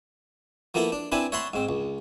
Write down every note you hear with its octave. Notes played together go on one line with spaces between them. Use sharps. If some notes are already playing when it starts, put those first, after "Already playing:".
F3 A#3 B3 E4 A4
D4
C4 D4 E4 B4 G#5
C#5 E5 F#5 A5 B5 C6
G#2 C4
C#2